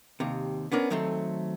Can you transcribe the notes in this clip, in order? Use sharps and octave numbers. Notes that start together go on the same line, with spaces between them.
D#2 C3
B3 C#4 D4 A#4
D#3 F#3 A3 C4 A4